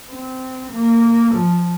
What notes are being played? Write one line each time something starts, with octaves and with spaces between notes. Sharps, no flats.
C4
A#3
F3